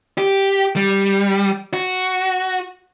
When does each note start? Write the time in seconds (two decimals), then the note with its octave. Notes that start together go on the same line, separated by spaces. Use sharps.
0.18 G4
0.76 G3
1.74 F#4